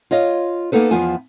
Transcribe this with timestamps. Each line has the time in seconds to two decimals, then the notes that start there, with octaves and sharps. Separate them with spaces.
0.11 F4 C#5 D#5 F5
0.72 A#3 B3 D#4 A4 B4
0.91 E2 F3 B3 F4 G#5